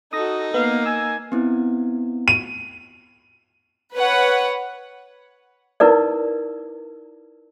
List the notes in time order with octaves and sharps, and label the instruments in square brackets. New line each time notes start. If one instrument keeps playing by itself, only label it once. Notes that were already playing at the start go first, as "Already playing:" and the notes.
[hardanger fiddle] D#4 [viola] F#4 A4 [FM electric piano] D#6 A#6
[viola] A#3 [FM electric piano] B3 [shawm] F5
[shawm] G#5 [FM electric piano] E6
[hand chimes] B3 C4 E4
[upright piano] D#7
[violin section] B4 C#5 F#5
[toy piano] D#4 E4 A#4 B4 D5